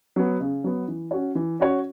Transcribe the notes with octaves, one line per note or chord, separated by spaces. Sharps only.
F#3 B3
C#3
F#3 B3
E3
C#4 F#4 C#5
E3
C#4 F#4 C#5